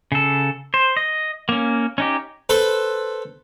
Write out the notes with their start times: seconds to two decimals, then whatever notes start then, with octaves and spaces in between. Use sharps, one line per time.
0.12 C#3 A4
0.74 C5
0.97 D#5
1.49 A#3 C#4
1.98 C#4 D#4 G4
2.49 A4 B4 C5